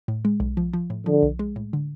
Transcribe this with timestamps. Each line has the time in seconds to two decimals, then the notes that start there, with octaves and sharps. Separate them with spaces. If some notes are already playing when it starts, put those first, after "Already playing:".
0.08 A2
0.25 G#3
0.40 B1
0.57 F3
0.73 F3
0.90 A2
1.06 D3 F3
1.23 B1
1.39 G#3
1.56 A2
1.73 D3